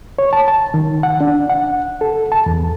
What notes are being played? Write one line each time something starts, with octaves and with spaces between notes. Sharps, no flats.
C#5
A5
A5
D#3
F#5
D4
F#5
A4
A5
E2